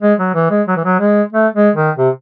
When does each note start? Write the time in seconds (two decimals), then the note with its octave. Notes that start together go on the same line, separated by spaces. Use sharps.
0.02 G#3
0.19 F#3
0.35 E3
0.50 G#3
0.68 F#3
0.76 E3
0.85 F#3
0.99 G#3
1.32 A3
1.55 G#3
1.76 D#3
1.98 C3